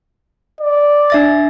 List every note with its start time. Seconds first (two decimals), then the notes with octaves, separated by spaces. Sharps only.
0.60 D5
1.10 D4 E5 A6